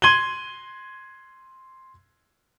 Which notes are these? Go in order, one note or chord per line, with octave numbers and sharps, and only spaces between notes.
C6 G#6 D#7 F#7 G7